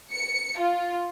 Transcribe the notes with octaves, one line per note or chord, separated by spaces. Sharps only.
C#7
F4